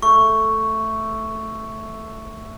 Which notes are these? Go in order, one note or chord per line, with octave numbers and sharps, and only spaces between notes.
A3 C#6